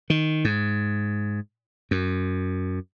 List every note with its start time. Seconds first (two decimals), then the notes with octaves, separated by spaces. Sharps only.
0.10 D#3
0.45 G#2
1.91 F#2